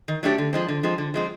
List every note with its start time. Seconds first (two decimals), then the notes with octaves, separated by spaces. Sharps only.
0.08 D#3
0.23 F#3 A3 D4 G4
0.38 D3
0.53 F3 G#3 C4
0.68 D3
0.83 F3 G#3 C4
0.98 D3
1.14 F3 G#3 C4